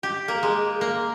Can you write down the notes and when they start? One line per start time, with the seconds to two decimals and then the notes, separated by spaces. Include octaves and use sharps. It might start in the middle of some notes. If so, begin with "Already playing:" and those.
0.03 G4
0.28 A#3
0.43 G#3
0.81 A#3